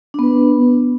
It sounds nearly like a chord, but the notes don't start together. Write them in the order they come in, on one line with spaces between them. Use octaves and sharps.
D4 B3 B4